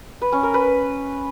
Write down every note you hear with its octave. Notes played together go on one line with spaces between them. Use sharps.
B4
C#4
A#4
B4